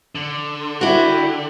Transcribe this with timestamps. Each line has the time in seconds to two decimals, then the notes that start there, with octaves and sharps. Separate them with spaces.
0.15 D3
0.81 E4 F#4 G4